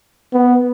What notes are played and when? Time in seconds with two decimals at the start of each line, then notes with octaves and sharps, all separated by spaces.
0.33 B3